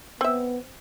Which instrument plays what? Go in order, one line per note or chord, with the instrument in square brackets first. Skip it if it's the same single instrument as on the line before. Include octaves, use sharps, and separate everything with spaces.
[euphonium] B3 [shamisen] C4 E5